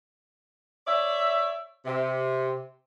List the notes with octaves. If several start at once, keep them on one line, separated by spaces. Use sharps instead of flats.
C#5 D5 E5
C3